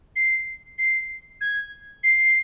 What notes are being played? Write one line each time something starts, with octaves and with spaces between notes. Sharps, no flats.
C7
C7
G#6
C7